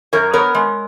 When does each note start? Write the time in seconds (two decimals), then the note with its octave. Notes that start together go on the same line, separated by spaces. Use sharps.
0.13 F#2 A#4 C#5
0.33 B3 A#4 C#5
0.55 G#3